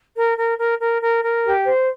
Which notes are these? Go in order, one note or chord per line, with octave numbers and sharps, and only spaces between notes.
A#4
A#4
A#4
A#4
A#4
A#4
G4
C5